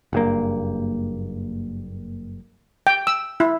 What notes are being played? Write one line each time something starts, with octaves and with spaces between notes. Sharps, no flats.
F#1 G2 A#3
G5
E6
E4